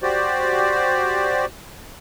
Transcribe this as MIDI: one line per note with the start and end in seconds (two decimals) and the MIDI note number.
0.03 1.45 66
0.03 1.45 67
0.03 1.45 72
0.03 1.45 74